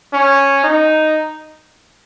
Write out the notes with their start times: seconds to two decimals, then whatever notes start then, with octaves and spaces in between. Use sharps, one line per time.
0.13 C#4
0.64 D#4